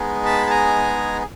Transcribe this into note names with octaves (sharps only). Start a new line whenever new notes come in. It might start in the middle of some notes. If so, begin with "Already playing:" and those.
Already playing: G#3 B3 D#4 G#4
A5 B5
A5
G#5 A#5